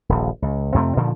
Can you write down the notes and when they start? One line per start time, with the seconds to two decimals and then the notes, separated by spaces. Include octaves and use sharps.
0.09 D#1 A#1
0.42 C#2
0.74 F2 C3 A3 C4
0.96 A#2 D3 D#3 F3